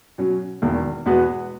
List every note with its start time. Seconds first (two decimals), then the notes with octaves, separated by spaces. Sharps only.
0.18 B2 F#3 C#4
0.62 E1 E2 D#3
1.06 E2 B2 G#3 B3 F#4